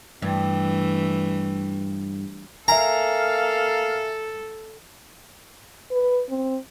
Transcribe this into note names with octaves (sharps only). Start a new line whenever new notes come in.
G2 E3 A3
A#3 A4 A#4 E5 F5 G#5 A#5
B4
C4